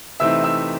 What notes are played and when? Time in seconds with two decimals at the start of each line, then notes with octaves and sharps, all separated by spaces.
0.20 C3 E3 A3 C4 D#4 E5 E6
0.44 E5 E6